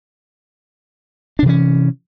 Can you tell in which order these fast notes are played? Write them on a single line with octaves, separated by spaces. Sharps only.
D4 C3 E3 C#4